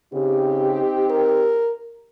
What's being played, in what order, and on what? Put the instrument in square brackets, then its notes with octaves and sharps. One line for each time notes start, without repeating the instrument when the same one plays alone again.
[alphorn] C#3 [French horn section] C4 D#4 G4
[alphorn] A#4